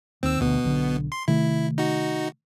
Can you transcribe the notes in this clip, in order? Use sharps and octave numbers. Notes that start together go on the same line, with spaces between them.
D#2 D#3 C4 E6
D2 B2 B3
B1 D3
C6
C3 D#3 A3 E4
D#4 F#4